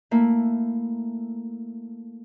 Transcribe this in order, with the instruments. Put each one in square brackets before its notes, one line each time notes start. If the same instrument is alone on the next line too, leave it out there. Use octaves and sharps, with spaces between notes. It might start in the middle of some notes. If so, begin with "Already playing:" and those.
[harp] A3 A#3 E4